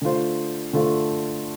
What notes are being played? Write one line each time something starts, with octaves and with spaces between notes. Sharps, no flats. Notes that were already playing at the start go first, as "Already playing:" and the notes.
D3 A3 F4 C5
D3 A3 F4 C5